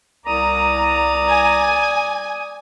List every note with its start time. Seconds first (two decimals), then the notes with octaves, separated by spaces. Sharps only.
0.25 C2 D5 A#5 D#6
1.28 G#5